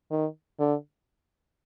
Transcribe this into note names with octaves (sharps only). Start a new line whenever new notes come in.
D#3
D3